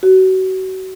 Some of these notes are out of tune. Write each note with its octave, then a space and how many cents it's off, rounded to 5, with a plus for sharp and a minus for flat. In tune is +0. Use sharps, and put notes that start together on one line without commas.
F#4 +30